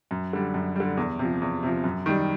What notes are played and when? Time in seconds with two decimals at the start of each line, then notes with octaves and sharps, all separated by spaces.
0.11 F#2
0.33 D3 G3
0.54 F#2
0.76 D3 G3
0.97 E2
1.19 C3 F3
1.42 E2
1.63 C3 F3
1.84 F#2
2.06 D#3 G3